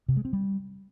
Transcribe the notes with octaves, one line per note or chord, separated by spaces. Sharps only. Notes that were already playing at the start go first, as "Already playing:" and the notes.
C3
G#3
C4
G3